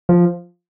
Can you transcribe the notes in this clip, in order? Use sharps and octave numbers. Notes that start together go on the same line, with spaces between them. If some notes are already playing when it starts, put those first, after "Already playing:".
F3